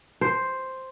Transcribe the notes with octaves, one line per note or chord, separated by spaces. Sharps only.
C5